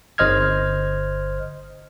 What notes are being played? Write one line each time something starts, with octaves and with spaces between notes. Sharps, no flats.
G1 C5 D#5 F6 G#6